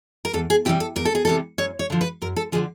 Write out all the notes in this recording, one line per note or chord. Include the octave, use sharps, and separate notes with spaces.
A#4
E2 A4
G#4
C3 E3 G3 G4
A4
E2 A#4
A4
G#4
C3 E3 G3 A4
F#2 C#5
C#5
D3 F3
B4
F#2 A#4
A4
D3 F3 G#4